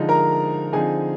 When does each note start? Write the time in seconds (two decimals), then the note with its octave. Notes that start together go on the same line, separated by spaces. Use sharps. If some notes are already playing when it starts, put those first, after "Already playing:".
Already playing: D3 F3 G#3 D#4
0.09 A#4 A#5
0.73 D3 F3 C4 D#4 G#4 G#5